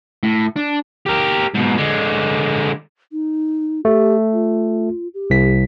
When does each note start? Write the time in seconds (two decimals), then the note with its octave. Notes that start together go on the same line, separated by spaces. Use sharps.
0.23 A2
0.56 D4
1.06 G4 A#4
1.54 G#2 B2
1.77 D3 G#3
3.12 D#4
3.85 A3 G4
4.33 F4
5.14 G4
5.30 C2 B6